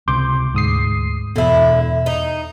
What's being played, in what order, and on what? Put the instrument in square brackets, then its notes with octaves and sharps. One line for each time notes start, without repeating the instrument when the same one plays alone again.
[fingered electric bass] C#2 C3 [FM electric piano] C6 D6 G6
[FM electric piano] D2 D#6 C7 [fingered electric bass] G#2
[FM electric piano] E2 B2 [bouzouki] D3 E4
[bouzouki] D#4